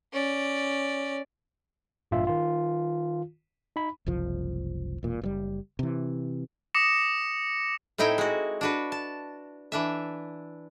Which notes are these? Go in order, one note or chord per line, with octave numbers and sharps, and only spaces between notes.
C#4 D5
A1 G2 A#2 F4 E5
D#3 F4
D#4 B5
F#1 C2 F3
E1 A#2
F#1 A#2 G3
C3 E3
D6 D#6 A#6 C#7 E7
A2 C4 D#4 E4 G5
G#3 F#4
D4 F#4 B4
A5
E3 D4 E5